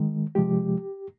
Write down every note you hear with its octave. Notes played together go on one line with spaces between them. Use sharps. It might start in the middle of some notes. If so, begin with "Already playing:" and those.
Already playing: D#3 G#3
C3 F3 G#3 G4